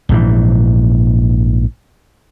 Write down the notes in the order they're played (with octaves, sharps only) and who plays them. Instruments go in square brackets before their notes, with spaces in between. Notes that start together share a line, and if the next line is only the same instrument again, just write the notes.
[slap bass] A#1 G#2 C3 E3